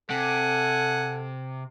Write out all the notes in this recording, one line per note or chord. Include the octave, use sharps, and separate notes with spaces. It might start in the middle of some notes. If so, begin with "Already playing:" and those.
C3 A4 F#5 G#5